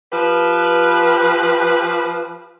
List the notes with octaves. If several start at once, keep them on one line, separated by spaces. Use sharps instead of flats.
F3 G4 B4